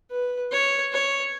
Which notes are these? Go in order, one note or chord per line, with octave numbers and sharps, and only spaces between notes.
B4
C#5
C#5